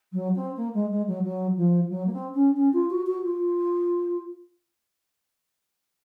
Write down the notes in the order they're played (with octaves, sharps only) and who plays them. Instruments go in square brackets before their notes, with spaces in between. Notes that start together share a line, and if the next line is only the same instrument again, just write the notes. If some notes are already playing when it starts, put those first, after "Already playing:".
[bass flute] F#3
C4
A#3
G#3
G#3
F#3
F#3
F3
F#3
A#3
C4
C#4
C#4
F4
F#4
F#4
F4